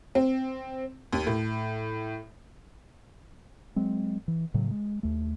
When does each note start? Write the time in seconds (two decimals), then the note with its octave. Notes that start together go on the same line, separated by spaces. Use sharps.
0.15 C4
1.13 D#2
1.27 A2
3.76 F#3 G#3 C4
4.28 E3
4.54 A2 C#3 F#3
4.71 G#3
5.03 D#2 A3